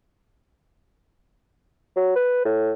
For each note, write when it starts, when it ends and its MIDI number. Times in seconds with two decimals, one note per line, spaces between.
1.96 2.13 54
2.16 2.40 71
2.45 2.73 45